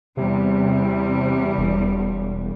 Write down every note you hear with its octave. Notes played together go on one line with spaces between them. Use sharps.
E2 C3 G3
E1